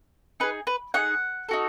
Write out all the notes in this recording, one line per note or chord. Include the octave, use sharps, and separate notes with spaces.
D#4 G#4 B4
B4
D#4 F#4 G#4 F#5
D#4 F#4 A4